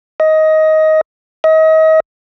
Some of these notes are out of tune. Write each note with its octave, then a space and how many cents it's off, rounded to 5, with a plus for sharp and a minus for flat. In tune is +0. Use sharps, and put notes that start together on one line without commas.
D#5 +15
D#5 +35